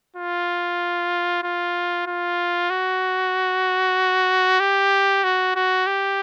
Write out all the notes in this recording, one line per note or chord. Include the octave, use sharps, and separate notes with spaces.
F4
F4
F4
F#4
G4
F#4
F#4
G4